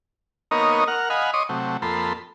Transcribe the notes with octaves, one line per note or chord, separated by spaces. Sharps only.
A#3 B3 D#4 A#4 C#5 D#5
A#4 F#5 F6
D#5 F5 F#5 G#5 B5
C#5 D#5 C6 D6 D#6
C3 F#3 A3
F2 A#3 A4 B5 C6